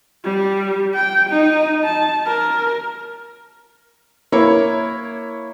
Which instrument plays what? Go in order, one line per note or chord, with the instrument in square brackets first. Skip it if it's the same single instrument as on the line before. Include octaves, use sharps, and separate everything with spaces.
[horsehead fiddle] G3
G5
D#4
A5
A#4
[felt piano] A#3 E4 C#5